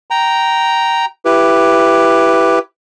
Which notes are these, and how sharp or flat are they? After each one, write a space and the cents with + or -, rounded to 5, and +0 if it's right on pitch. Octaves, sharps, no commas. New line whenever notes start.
G5 -15 A#5 +0
E4 +20 G4 +0 B4 +0